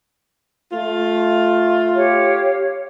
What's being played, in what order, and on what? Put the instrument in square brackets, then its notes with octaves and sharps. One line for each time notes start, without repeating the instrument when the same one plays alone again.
[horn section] A3 F4
[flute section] G4 C#5 F5